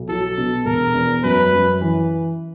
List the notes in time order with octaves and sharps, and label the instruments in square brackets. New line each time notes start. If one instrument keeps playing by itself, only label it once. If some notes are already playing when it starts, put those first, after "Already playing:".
Already playing: [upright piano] B1
[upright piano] F#3 [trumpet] A4
[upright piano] B2
[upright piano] E1 [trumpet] A#4
[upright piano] E2
[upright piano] F#2 [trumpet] B4
[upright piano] F#2
E3